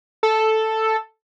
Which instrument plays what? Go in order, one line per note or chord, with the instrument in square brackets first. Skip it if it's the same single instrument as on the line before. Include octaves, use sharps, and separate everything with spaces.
[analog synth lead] A4